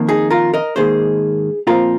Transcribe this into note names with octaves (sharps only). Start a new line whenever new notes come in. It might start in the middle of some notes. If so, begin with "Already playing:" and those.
Already playing: F2 D#3 A#3
D#4 G#4
F4 A#4
A#4 D#5
G#2 D#3 A#3 G#4 C5
A#2 F3 C4 F4 A#4